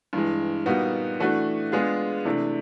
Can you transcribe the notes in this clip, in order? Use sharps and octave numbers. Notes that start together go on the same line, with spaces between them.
G2 E3 G#3
A#2 G3 B3 D#4 F#4
E3 A3 D4 F#4 B4
G#3 B3 D4 F4 G#4
C3 E3 A3 D4